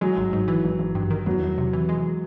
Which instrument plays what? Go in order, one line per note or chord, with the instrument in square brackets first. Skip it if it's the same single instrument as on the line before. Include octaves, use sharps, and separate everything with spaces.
[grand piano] F#3 [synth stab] G#3
[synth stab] G#1
G#2
E3
G#1
G#1
G2
D#3
[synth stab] E2 [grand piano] F#3
[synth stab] E2
C3
E3
G#3